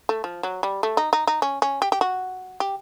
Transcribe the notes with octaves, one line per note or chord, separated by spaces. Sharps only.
A3
F3
F#3
G3
A3
D#4
D#4
D#4
C#4
C#4
G4
G4
F#4
G4